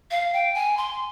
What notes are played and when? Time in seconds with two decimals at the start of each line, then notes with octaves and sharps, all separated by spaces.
0.11 F5
0.33 G5
0.54 G#5
0.77 C6